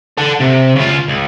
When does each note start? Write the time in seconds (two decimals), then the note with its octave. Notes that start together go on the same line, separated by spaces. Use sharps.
0.18 A4 F#5
0.40 C3
0.76 C#3 F4
1.08 C#2